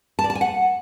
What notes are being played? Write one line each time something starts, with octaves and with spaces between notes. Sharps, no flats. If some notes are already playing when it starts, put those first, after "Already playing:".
A5
D5
A5
G#5
F#5